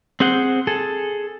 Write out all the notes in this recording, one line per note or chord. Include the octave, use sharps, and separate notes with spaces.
C4 G#4 C5 F#5
G#4 A4